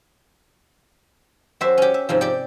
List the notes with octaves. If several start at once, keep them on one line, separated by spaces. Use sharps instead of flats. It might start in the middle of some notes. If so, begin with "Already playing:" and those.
F#2 F#4 G4 C5 E5
C#4 G4
E5
G#2 C3 F3
G4 D5